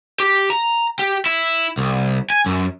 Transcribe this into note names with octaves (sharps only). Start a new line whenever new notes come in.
G4
A#5
G4
E4
C2
G#5
F#2